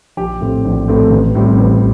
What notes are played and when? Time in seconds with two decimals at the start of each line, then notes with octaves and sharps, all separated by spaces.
0.17 A#1 G4
0.40 A2 A3 C4
0.65 A#1
0.88 A2 A3 C4
1.11 A1
1.35 A2 G3 C4
1.58 A1